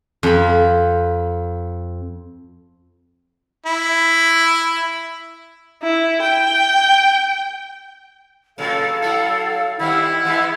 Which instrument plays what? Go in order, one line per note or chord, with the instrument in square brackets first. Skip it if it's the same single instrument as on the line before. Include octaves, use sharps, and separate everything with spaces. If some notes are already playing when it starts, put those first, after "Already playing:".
[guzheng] F2 B5
[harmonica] E4
[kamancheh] E4
G5
[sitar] A2 C#3 F#3 [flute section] A4 F5
[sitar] F#3 A3 E4
[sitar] D#3 G3 C4 [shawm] E4 [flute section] F#5
[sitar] E3 G#3 B3